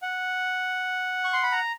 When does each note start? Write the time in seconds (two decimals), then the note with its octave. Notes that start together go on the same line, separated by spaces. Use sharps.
0.02 F#5
1.24 C#6
1.33 C6
1.43 B5
1.52 A#5